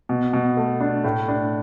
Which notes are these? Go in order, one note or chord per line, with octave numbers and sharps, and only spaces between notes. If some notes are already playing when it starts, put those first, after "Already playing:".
B2
B2
A3
D4
A2
D4